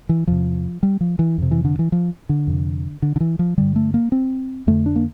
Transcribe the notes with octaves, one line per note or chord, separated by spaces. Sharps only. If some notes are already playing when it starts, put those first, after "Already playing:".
E3
E2 C3 F3
G3
F3
E3
F2 C3
E3
D3
E3
F3
D3
F2 C3
D3
D3
E3
F3
G2 D3 G3
A3
A#3
C4
F2 D3 A3
D4
A#3